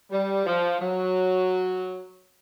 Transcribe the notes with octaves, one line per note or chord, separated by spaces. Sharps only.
G3
F3
F#3